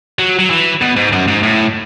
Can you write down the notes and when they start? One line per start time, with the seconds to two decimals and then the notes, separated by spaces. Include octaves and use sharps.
0.19 F#3
0.39 F#3
0.50 E3
0.81 B2
0.96 G#2
1.12 F#2
1.28 G#2
1.43 A2